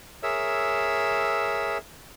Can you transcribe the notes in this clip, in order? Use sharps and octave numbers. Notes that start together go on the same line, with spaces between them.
G#4 A#4 C#5 E5 E6